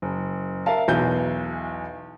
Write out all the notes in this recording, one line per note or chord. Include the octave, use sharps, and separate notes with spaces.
F#1
A#4 E5 F5 A5
B1 E2 E3 G6